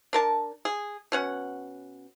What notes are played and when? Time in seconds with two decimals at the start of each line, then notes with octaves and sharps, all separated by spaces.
0.13 D4 A#4 A5
0.65 G#4
1.12 B2 C#4 F#5